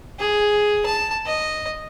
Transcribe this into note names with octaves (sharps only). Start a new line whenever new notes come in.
G#4
A5
D#5